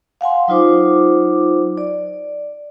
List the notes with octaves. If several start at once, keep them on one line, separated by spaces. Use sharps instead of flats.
F5 F#5 G#5 C6
F#3 D#4 F4 C5 D6
D5